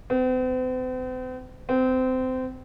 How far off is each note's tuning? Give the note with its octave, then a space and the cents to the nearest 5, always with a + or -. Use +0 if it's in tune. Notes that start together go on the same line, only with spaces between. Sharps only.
C4 -45
C4 -25